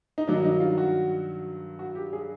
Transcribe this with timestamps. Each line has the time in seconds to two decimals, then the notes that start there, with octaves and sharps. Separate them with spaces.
0.18 D#4
0.28 G2 D#3 F#3 D4
0.44 D#4
0.60 F4
0.78 F#4
1.79 F#4
1.95 G4
2.13 G#4